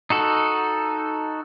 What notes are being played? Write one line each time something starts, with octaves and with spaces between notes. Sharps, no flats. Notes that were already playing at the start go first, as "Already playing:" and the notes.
D#4 F#4 A4